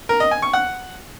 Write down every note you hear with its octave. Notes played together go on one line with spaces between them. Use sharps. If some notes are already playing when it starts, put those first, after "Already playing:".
A#4
D#5
G#5
C#6
F#5